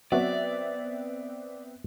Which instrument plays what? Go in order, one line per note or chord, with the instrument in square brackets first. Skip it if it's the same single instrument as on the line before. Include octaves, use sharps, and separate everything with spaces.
[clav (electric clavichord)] F#3 F#4 [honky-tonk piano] B3 C4 E5 [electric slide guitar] D5